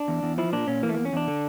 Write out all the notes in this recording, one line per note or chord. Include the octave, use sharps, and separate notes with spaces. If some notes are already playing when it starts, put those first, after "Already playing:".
Already playing: D4
E2
E2
F3 E4
A#2 D4
A#2 C#4
E3 A#3
A3
E2 A#3
C#4
E2 D4
D3